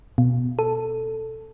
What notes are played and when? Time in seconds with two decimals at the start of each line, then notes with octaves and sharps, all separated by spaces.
0.18 B2
0.59 A4